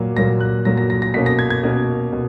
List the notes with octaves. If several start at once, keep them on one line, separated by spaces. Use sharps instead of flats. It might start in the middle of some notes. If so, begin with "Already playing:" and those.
Already playing: A#2 F#3 A#3
A#2 F#3 A#3 A#6
F#6
A#2 F#3 A#3 A#6
A#6
A#6
A#6
B2 A#3 C#4 B6
A#6
G#6
G#6
B2 A#3 C#4
B2